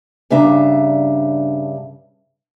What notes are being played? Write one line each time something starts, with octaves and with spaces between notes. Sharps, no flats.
G2 C#3 D4 E5 A#5